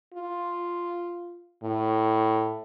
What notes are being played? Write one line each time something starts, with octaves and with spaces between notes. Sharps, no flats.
F4
A2